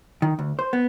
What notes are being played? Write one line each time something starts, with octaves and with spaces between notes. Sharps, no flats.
D#3
D2
C5
B3